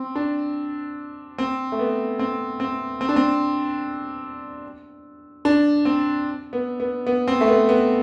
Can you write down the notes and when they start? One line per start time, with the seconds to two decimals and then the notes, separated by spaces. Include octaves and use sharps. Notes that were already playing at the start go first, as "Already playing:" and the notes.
Already playing: C4
0.15 D4
1.38 C4
1.72 A3
1.79 B3
2.19 C4
2.60 C4
3.01 C4
3.09 D4
3.16 C4
5.45 D4
5.85 C4
6.53 B3
6.80 B3
7.07 B3
7.28 C4
7.41 A3
7.48 B3
7.69 B3